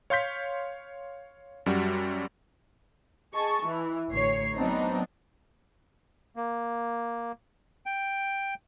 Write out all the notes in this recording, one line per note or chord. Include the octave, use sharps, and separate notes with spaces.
C#5 F5 C6 G6 B6
F#2 G3 F#4
G#4 D#5 A5 C#6
E3
A1 D2 C#5 C7
F#3 B3 C4 D4 D#4
A#3
G5